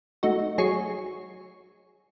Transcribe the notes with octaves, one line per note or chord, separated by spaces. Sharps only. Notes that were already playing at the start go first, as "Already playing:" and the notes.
A3 D#4 F#4
F#3 G#4 C#5 C7 C#7